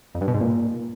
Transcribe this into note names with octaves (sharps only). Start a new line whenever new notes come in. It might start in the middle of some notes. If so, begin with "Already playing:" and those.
F2
G2
B2
G#2
A#2